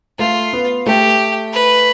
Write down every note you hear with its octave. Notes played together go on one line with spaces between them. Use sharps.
A3 F4
B3
A3 G4
B4